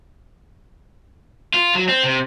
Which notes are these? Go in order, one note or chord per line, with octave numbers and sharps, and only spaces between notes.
F4
F#3
C4
C3